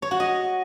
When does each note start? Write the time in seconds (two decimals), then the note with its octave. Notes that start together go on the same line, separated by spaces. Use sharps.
0.02 C#5
0.11 F#4
0.20 D#5